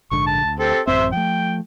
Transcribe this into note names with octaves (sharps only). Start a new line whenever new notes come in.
A#1 G#2 D3 C#6
A5
D2
C4 G4 A4
A1 F#2 C4 C5 E5
F3 A3 G5